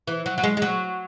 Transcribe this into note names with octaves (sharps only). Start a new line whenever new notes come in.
E3
F#3
F#3
G#3
G#3
F#3